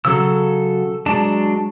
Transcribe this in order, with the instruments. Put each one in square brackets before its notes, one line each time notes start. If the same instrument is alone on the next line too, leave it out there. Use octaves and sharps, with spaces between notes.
[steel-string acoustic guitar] C#3 F#3 [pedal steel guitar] A4 E6
[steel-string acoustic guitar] F#3 G#3 [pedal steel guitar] D4 A5